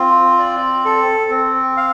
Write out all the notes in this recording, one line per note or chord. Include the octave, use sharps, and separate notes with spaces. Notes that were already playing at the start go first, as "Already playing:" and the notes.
Already playing: C4 F4
D5
A4
C4
F5